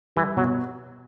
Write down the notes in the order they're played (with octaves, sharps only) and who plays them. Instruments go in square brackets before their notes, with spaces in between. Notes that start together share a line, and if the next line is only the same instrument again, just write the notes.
[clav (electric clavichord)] E3 [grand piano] G3
[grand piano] B2 [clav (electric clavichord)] F#3